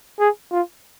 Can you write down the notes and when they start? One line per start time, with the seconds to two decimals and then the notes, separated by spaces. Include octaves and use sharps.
0.20 G#4
0.52 F4